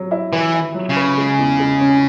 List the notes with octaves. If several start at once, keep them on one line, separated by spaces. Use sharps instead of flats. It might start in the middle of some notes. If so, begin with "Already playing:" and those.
Already playing: F#3
E4
E3 B4
E4
F#3
C#3
B4
G#3
E2
G#3
C#4